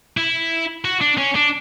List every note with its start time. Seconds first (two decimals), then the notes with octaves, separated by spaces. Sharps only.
0.17 E4
0.85 F#4
1.01 D4
1.18 C#4
1.35 D4